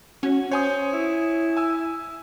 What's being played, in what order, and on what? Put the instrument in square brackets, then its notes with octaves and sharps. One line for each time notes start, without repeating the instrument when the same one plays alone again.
[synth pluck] C#4 [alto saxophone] F#4
[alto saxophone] C5 [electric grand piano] C#5 G#5 D#6
[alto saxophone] E4
[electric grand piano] G#5 E6